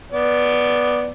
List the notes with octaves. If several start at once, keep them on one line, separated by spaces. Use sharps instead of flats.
B3 D5